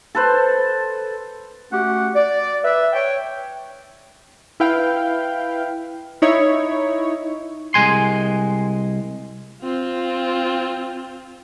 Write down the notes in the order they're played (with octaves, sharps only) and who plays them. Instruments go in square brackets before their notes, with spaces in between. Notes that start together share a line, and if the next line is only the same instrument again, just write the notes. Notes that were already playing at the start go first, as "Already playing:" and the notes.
[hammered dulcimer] A4 B4 C5
[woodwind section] A3 C#4 F#4 G4 F#5
D5
B4 E5
C#5 G5
[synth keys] E4 B4 F5 G5
D#4 E4 C#5
[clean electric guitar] C2 G#3 G#5 C6
[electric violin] C4 F4